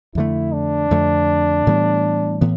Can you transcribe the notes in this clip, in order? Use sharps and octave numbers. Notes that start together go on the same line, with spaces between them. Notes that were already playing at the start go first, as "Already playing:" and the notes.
F2 D3 A3 E4
D4
F2 D3 A3
A2 E3 G3 B3
A2 E3 B3